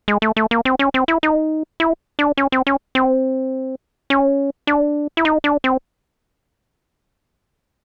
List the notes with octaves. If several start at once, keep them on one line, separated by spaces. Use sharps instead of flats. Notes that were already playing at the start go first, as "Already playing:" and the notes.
G#3
A3
A3
A#3
C4
C#4
C4
E4
D#4
E4
D4
C#4
C4
C#4
C4
C#4
D4
E4
D#4
D4
C4